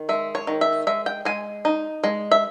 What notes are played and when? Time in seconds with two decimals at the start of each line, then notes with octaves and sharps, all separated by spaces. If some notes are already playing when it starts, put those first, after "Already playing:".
Already playing: D#3
0.09 G#3 E5
0.35 C#5
0.47 D#3
0.61 E5
0.87 G#3 E5
1.06 G5
1.25 G#3 G#5
1.65 D#4
2.04 G#3
2.31 E5